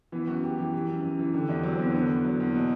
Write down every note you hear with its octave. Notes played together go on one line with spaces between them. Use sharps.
E3 B3
F#2 F#4
F#2 G4
E3 G4
E3
F#2
F#2
E3
D3 G4
E2 D4
F#3 C4
E2 B3
D3 B3
E2
F#3
E2
B2